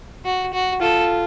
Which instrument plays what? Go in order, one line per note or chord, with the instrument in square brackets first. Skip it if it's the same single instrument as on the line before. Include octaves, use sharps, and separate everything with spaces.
[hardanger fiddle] F#4
F#4
[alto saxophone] F4 [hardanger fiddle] A4